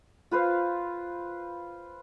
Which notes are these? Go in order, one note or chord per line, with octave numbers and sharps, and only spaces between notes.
F4 B4 C5 F5